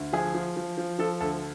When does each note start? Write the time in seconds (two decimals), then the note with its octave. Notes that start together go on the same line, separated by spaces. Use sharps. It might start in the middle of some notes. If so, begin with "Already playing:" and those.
Already playing: D2
0.13 F3 G#4
0.34 F3
0.57 F3
0.78 F3
0.99 F3 A4
1.21 D2 A4